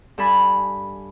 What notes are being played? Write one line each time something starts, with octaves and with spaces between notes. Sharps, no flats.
G2 A4 G#5 B5